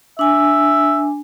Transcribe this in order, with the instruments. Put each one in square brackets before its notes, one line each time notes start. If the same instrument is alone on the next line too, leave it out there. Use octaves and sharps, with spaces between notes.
[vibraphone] D4 G#5 [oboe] E5